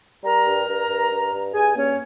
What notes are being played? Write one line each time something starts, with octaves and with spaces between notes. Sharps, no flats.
G3 A#4 A#5
G2
G2
G2
G2
G2
G2 G#4 G#5
A#3 C#4 C#5